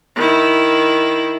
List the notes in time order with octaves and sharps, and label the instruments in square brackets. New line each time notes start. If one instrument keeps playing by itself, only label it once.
[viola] D#3 E4